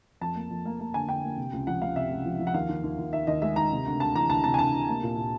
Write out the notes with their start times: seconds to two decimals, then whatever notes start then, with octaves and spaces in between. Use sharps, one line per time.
0.21 F2 A5
0.36 A#3
0.51 F2
0.65 A#3
0.80 A#3
0.94 D3 G#5
1.08 D3 G5
1.23 A#3
1.37 C3
1.53 C#2
1.67 F3 F#5
1.81 C#2 F5
1.96 C3 E5
2.11 C#2
2.26 F3
2.39 F3
2.47 F#5
2.54 D#2 F5
2.69 D#2
2.84 D#2
2.98 D#2
3.13 D#3 E5
3.27 D#2 D#5
3.42 G#3 E5
3.56 D#3 A#5
3.72 C3
3.86 D2
4.00 D2 A5
4.15 E3 A#5
4.29 D2 A5
4.44 C3 A5
4.54 G#5
4.59 D2 A5
4.74 C3
4.88 A#3
5.03 A#2
5.18 A#2